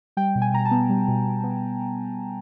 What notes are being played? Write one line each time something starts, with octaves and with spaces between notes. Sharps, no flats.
G3 G5
B2
G#5
B2 A#5
A5
B3
G3
B2
B2
B3